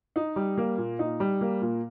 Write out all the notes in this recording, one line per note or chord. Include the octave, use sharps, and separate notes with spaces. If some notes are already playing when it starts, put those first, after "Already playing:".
D#4
G3
A#3
A#2
D#4
G3
A#3
A#2